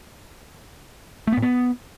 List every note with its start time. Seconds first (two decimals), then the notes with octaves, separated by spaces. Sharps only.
1.27 A3
1.32 B3
1.37 A2
1.42 B3